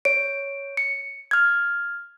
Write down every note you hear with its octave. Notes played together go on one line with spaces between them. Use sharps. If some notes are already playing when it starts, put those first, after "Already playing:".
C#5 D7
C#7
F6 G#6